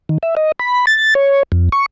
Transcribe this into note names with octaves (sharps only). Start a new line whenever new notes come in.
D#3
E5
D#5
B5
A6
C#5
F2
C#6